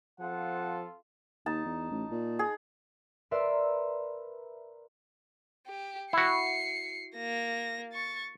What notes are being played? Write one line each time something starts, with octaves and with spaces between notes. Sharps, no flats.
F3 C4 F4 A4 F#5
D#2 D#4 A5
E2
A1
A#2
G#4
A#4 B4 D5 E5 C6 E6
G4
E4 F#4 C7 C#7
A#3 A#6
C#6 A6